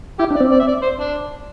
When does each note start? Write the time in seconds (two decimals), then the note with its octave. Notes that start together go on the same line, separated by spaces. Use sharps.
0.19 E4 G4
0.31 D4
0.36 D5
0.40 C4
0.51 D5
0.59 E5
0.67 D5
0.82 C5
0.99 D4